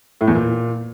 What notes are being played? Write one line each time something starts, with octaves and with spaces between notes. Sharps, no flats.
A2
E2
A#2